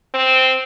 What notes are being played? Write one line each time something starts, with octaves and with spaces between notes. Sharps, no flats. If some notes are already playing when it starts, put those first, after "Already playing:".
C4